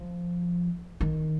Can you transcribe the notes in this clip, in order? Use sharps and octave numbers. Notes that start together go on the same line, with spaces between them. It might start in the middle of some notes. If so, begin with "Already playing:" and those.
Already playing: F3
D#3